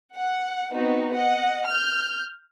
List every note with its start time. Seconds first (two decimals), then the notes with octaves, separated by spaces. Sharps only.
0.15 F#5
0.72 B3 C4 D#4 F#4
1.14 D#5 F#5
1.66 F6 G6